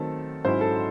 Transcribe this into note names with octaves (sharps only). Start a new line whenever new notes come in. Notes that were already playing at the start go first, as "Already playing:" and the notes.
Already playing: D#3 F#3 A3 C4 A4
G#2 F#3 C#4 E4 C5
A4